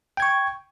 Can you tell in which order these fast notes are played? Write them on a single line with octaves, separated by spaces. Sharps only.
G5 G#6 C#6